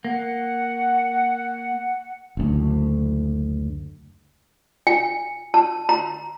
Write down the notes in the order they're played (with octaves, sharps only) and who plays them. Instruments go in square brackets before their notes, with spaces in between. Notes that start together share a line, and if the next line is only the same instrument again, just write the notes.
[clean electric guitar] A#3 [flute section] F#5
[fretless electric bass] F#1 D2
[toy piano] G#5
A5
A#5